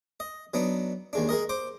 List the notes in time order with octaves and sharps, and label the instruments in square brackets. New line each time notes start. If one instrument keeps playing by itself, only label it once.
[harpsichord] D#5
F#3 B3 D4 D#4
D#2 G#3 D4
G#3 G#4 A#4 D#5
C5 D6